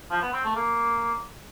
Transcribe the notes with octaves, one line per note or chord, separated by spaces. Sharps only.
F3
B3
C4
A3
A#3